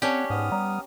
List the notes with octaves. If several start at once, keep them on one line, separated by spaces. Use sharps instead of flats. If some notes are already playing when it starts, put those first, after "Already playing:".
C4 C#4 G4 C#5 D5 F#5 G#5 A5
G#2 B3 D#6 F6
G3 A#5